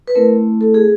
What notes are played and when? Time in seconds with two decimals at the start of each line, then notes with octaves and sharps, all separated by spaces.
0.08 B4
0.15 A3 C4 E4 A#4
0.61 A4
0.74 G#4